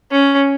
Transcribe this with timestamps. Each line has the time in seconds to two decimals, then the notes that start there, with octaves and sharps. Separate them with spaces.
0.11 C#4